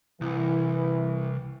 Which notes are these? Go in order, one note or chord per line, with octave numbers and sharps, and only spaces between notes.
C2 E3